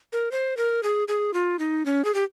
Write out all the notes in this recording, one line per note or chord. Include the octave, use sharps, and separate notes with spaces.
A#4
C5
A#4
G#4
G#4
F4
D#4
C#4
G#4
G4